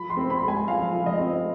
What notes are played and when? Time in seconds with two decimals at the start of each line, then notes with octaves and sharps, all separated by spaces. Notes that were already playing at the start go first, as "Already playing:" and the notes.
Already playing: F3 B5
0.10 C6
0.17 C4
0.30 B5
0.43 G#3
0.48 G#5
0.68 F3 F5
0.93 F3
1.06 D#5
1.19 C4